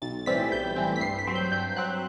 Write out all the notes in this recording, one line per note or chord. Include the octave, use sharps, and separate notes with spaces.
B1 A6
A2 E3 G3 C4 B6
B1 G6
A2 E3 G3 C4
B6
G2 C7
B6
F#3 C4
G6
G2 G6
F#3 C4 F#6